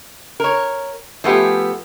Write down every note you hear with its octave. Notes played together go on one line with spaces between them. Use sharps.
A#4 C#5
F3 A3 B3 G4 G#5